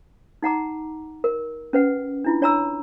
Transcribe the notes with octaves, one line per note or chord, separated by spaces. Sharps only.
D#4 F#5 A#5 D6
A#4
C#4 B4 F#5
D4 E4 F4
D4 C#5 G#5 A#5 B5 E6